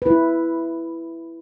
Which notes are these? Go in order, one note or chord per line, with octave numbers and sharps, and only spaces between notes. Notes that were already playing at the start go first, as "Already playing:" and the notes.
E4 B4